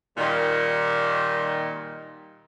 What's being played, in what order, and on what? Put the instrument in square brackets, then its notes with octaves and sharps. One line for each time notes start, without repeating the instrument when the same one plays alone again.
[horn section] A#2 D#3 G3